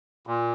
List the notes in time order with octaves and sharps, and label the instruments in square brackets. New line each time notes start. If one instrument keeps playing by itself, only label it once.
[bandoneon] A#2